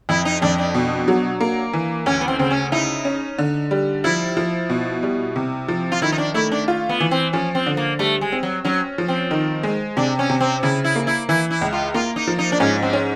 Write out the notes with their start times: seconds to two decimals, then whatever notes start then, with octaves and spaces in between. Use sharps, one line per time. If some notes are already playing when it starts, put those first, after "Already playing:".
0.09 F2 E4
0.25 D#4
0.42 F2 D4
0.58 D4
0.74 B2
1.08 F#3
1.41 A#3
1.73 E3
2.06 D2 C#4
2.21 B3
2.28 C4
2.39 C#3 C4
2.51 C#4
2.72 D#4 E4
3.05 C#4
3.38 D3
3.71 G3
4.04 F3 E4
4.37 F3
4.69 B2
5.03 G3
5.36 C3
5.68 F3
5.92 F4
6.02 D#3 E4
6.12 D#4
6.18 D4
6.34 A3 E4
6.52 D4
6.68 F4
6.89 B3
7.00 E3
7.11 C4
7.33 F3 C#4
7.55 C4
7.66 D3
7.77 A#3
7.99 G3 A3
8.21 G#3
8.32 C4
8.43 F#3
8.65 F#3 C#4
8.98 F3
9.08 C4
9.31 D#3
9.63 G#3
9.97 C3 D4
10.19 C#4
10.30 C3
10.41 C4
10.63 C#3 E4
10.84 E4
10.96 A#3
11.07 E4
11.29 E3 E4
11.51 E4
11.61 C#2
11.73 F4
11.94 A#3 F4
12.16 D#4
12.27 F3
12.39 D#4
12.52 D4
12.60 G#2 C#4
12.82 C4
12.93 C#4